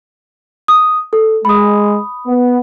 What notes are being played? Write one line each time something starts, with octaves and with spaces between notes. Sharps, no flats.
D#6
A4
G#3 B5 D#6
B3